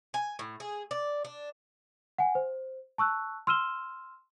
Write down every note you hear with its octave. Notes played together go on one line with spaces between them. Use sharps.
G#5
A2
G#4
D5
D4
F#5 G#5
C5
A5 C#6 E6 F#6
C6 E6 F6 D#7 E7 G7